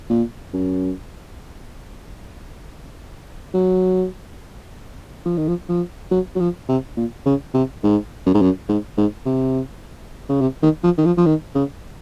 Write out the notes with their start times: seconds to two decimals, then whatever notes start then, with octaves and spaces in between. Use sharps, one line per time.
0.10 A#2
0.53 F#2
3.54 F#3
5.26 F3
5.37 D#3
5.48 F3
5.69 F3
6.11 F#3
6.36 F#3
6.40 F3
6.69 C3
6.97 A#2
7.26 C#3
7.54 C3
7.84 G#2
8.26 F#2
8.34 G#2
8.41 F#2
8.69 G#2
8.97 G#2
9.26 C3
10.29 C#3
10.41 C3
10.63 D#3
10.83 F3
10.98 D#3
11.06 F3
11.17 F3
11.26 D#3
11.55 C#3